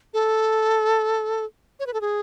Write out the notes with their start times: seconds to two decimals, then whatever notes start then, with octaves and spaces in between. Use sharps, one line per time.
0.14 A4
1.80 C#5
1.87 B4
1.94 A4
2.01 G#4